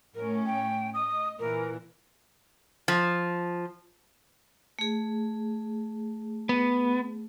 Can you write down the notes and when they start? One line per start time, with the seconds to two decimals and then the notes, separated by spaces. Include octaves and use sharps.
0.15 A2 C#4 A#4
0.46 G5
0.94 D#5 D#6
1.39 A#2 E3 A#4
2.88 F3
4.79 A3 G#4
6.49 B3